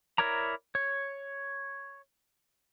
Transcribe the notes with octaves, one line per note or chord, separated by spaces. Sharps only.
E4 A#4 C#5 D5 A#5
C#5